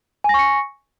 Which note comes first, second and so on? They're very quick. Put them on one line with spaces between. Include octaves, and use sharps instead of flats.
G#5 A#6 C#6 C#7